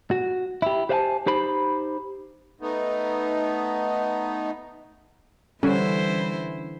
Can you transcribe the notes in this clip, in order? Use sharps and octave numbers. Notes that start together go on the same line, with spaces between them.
F#4
E4 G4
G4 C5 E5 F#5 G#5 A5
D#4 G4 C5 B5
A3 B3 D#4
D3 E3 G3 C#4 E4 C5